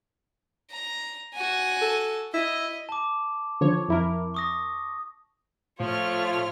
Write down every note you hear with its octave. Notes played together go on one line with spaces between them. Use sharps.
A#5
F#4 G#5
A4
E4 D#5
A5 D6
D3 F3 C#5
F2 E4 A#4
C#6 D#6 A#6
A2 F3 A3 F4 C#5 F6